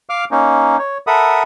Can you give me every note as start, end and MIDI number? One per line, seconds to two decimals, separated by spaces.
0.09 0.25 77
0.09 0.25 86
0.09 0.25 89
0.31 0.77 58
0.31 0.77 61
0.31 0.77 63
0.79 0.98 73
1.07 1.43 69
1.07 1.43 70
1.07 1.43 76
1.07 1.43 78
1.07 1.43 83
1.07 1.43 87